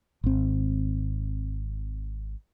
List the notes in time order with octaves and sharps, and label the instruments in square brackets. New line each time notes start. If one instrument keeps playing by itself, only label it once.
[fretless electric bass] G#1 C4